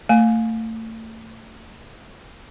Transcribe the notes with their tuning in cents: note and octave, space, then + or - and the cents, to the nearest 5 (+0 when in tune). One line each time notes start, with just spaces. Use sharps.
A3 +35 G#5 +0